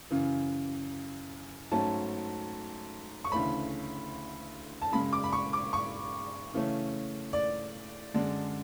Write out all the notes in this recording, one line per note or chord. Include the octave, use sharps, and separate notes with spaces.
F#2 C#3 E3
G#2 F#3 A3 C#4 A5
C#6
D2 C#3 E3 A3 C#4 B5
A5
F#2 C#3 G#3 B5
D6
B5
C#6
D6
C#6
C#3 E3 A3 C#4
D5
F#2 D3 G#3 D4